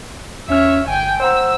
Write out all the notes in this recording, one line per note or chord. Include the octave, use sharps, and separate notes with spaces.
E2 C#4 C#5 E5 F6
G1 G5 G#5
C5 F#5 A#5 E6